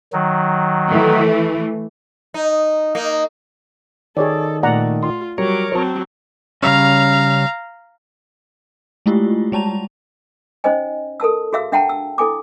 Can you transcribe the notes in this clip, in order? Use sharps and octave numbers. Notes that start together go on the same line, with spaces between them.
D#3 F#3
E3 A3
D#4
A#3 D#4
D#3 G#4 A4 C#5 D5
A#2 A3 D5 F#5 A#5
F4 C6
F#3 G3 A#4 C#5 D6
F#3 C4 C5 A5
C#3 G3 C#4 F5 A#5
G#3 A3 E4 F4 G4
G3 G#3 A5 A#5 F7
C#4 D#4 C5 D#5 G#5
A4 A#4 A5 E6
F#4 G#4 E5 F5 E6
D4 E5 F#5 G5 A5 A#5
E6
E4 A4 G#5 D6